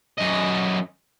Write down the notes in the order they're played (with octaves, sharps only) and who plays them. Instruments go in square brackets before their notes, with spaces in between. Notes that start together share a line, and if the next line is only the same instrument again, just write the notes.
[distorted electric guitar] F#2 D#5